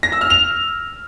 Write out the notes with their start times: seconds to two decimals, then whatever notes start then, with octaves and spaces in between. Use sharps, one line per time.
0.03 A#6
0.12 E6
0.21 F6
0.30 F7